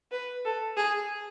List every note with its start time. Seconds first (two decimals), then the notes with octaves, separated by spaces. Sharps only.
0.12 B4
0.45 A4
0.77 G#4